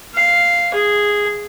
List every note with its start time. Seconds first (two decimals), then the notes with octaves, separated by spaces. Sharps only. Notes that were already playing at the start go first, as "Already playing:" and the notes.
0.14 F5
0.74 G#4